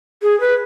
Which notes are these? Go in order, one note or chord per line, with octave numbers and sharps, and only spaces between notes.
G#4
B4